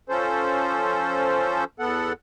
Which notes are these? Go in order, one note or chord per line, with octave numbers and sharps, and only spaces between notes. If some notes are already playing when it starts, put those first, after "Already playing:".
F3 C#4 A4 C5
E2 B3 A4 F#5